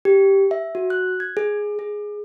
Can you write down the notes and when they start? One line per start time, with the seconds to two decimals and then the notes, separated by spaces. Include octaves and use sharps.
0.05 G4
0.51 E5
0.75 F#4
0.90 F#6
1.20 G#6
1.37 G#4
1.79 G#4